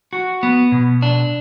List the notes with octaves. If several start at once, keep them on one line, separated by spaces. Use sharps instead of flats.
F#4
B3
B2
D4